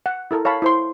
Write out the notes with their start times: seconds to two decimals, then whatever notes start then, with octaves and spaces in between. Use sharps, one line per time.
0.06 F#5
0.31 E4 A4 A#4
0.45 C#5 F5 A5 B5
0.62 E4 C5 C6